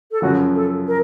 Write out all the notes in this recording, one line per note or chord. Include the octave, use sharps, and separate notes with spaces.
A4
F#2 C#3 F3 F#4
A4
A#4